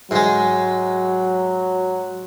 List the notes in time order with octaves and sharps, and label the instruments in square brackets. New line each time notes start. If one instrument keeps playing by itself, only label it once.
[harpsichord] G#2 G#3 [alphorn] F#3